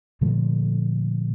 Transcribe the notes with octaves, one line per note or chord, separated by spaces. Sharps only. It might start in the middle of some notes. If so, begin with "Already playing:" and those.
A#2 D3 F3 A3